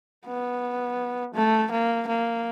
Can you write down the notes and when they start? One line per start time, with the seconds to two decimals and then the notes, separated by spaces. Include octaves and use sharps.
0.27 B3
1.35 A3
1.72 A#3
2.08 A#3